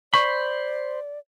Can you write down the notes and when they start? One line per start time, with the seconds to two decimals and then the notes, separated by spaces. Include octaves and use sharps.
0.14 C5 D5 B5 C#6